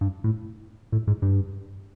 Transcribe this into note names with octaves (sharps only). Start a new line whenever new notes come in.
G2
A2
A2
G#2
G2